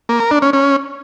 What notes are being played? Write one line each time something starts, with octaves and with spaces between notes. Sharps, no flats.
A#3
A#4
D4
C#4
C#4